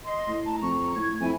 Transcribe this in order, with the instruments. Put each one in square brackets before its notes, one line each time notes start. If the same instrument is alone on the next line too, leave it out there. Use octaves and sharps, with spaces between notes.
[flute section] D#5 C6
[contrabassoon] A2
[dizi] A5 [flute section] A#5
[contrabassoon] F2 [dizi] C#6
[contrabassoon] A2 [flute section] G#6
[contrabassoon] F2 [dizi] E4 [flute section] E5 G#5